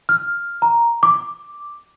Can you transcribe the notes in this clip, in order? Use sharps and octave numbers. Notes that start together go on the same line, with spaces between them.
F6
A#5
D6